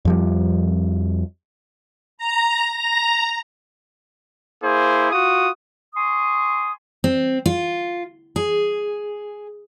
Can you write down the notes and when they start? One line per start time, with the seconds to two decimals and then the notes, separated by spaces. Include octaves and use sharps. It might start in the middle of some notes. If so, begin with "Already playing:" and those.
0.05 F2 F3 G3
2.18 A#5
2.77 A#5
4.63 A#3 E4 G#4 C5
5.12 F4 F#4 D#6
5.94 G#5 C6 C#6 D#6
7.04 C4
7.46 F4
8.36 G#4